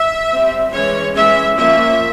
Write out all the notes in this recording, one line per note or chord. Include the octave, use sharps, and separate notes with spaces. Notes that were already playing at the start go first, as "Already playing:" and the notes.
Already playing: E5
G3 C4
E3 G#3 C#4 C#5
E3 G#3 C#4 E5
F3 A#3 C#4 E5